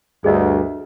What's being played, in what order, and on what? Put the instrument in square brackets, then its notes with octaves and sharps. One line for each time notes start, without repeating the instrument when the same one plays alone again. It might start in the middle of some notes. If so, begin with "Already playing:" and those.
[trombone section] D2 G2 [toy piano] G#4 D#5